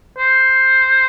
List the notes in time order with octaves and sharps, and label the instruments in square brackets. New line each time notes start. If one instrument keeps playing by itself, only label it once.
[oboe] C5